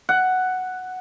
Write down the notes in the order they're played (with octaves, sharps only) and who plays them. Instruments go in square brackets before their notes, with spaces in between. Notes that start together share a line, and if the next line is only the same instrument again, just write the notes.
[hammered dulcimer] F#5